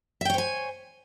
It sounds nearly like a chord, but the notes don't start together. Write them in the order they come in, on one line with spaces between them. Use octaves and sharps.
E5 G5 C#5 C5 G#5